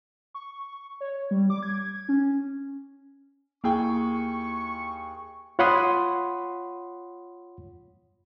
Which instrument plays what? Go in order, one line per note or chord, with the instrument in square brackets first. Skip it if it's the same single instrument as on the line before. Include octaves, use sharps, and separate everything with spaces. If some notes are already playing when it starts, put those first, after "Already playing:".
[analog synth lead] C#6
C#5
G3
D6
G#6
C#4
[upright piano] D#2 G#4 G5 [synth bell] A#3 E4 [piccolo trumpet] C#6
[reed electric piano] F4 C#5 F#5 B5 C6 D#6